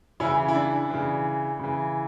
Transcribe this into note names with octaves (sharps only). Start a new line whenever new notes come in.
C#3 E3 C#4 E4
E4
D4
C#3 E3
C#3 E3